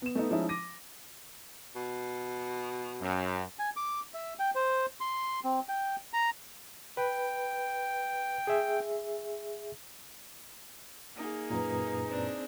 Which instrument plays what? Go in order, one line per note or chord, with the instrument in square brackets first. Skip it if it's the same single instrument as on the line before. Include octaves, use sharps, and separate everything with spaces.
[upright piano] B3 E7
A3 B3 D#4
F3 G#3 C#4 D#4 E4
D6 A#6 D#7
[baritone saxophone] B2
[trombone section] F#2
[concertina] G#5
D6
E5
G5
C5
C6
C4
G5
A#5
[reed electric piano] B4 [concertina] G5
[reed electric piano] G#4 E5
[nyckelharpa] A#3 [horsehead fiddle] D#4 G#4
[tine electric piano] F#2 A#2 [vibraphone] B4 A#5
[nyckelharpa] C4 D4